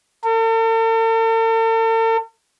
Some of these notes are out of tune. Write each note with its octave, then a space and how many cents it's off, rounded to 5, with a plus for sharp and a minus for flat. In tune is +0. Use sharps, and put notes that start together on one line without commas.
A4 +45